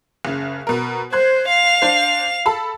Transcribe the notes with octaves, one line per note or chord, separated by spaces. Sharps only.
F#1 C#3
B2 A#4
C5 C6 F#6 G#6
F5 F7
D4 C5
A4 A5 B5